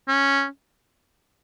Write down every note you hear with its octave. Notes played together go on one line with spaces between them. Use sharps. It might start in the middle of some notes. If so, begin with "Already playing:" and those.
C#4